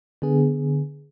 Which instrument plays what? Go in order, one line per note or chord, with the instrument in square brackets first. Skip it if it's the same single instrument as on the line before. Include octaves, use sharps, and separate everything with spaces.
[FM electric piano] D3 B3 G#4